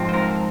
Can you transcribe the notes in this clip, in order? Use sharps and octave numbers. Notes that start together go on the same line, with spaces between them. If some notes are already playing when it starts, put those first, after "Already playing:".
Already playing: G#2 F3 C4
C5
A#4